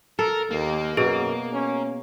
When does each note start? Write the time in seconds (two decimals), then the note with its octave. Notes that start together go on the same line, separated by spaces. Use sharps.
0.19 A4 A#4
0.51 D#2 A#3
0.97 F#2 B2 G#4
1.53 C#4